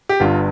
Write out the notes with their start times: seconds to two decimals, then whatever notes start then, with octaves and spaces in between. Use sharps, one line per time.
0.09 G4
0.20 G1 G2 D3 F4